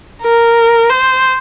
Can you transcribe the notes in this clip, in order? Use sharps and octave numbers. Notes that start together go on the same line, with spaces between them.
A#4
C5